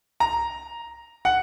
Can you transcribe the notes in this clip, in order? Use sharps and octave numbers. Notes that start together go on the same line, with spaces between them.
A#5
F#5